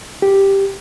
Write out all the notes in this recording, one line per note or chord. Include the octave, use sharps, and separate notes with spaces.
G4